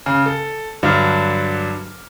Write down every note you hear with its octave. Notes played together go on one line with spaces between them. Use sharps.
C#3
A4
G2 D3 F#3 D4 F6